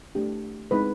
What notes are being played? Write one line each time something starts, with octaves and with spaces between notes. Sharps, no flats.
A3 D4 G4
G#3 C4 D#4 B4